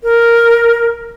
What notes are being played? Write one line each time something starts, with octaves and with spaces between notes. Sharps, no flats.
A#4